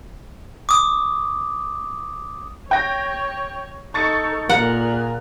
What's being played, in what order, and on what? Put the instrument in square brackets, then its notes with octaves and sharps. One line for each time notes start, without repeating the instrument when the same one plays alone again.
[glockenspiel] D6 D#6
[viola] C#5 [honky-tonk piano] G5 A#6
[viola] D#4 A4 [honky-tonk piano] C#6 A6 C#7
[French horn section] A#2 [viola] G#4 A#4 [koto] F#5 [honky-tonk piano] A#5